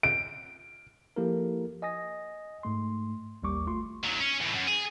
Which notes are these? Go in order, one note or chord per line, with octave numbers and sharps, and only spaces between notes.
D7
F3 A#3 E4 G4 A4 A#4
D#5 G#5 D#6 A#6
G#2 A3 C6
A1 D#2 G3 A#3 C#6 D6
G#1 A3 F4 C6 C#6
D#2 F#3
C#4
E2 A2
F#2
G#4